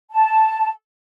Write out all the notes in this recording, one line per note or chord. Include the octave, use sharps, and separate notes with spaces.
A5